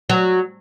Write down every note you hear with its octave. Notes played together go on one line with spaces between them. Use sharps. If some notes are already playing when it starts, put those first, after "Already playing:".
F#3